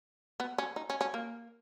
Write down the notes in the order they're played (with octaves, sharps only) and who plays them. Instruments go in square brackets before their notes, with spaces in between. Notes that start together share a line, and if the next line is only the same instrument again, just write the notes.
[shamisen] B3
C#4
D#4
C#4
C#4
A#3